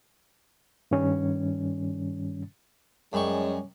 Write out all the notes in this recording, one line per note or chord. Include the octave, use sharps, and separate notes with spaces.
G2 D#3 G3 C#4
F#2 G3 G#3 C#4 C#6